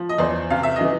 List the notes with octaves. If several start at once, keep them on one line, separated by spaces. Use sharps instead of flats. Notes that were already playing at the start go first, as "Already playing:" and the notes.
Already playing: F3
D#5
E2 C5 D5
C3 F5
E5
E3 D#5